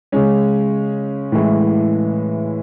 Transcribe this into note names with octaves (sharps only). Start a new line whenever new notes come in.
C#3 G#3 C#4
A2 E3 G#3